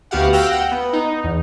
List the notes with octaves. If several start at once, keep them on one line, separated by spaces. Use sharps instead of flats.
D2 B3 F#4 G4 F5 F#5
F5 G5 E6 F#6 A#6
F#5 G5
B3
D#4
E2